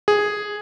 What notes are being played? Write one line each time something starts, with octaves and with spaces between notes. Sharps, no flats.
G#4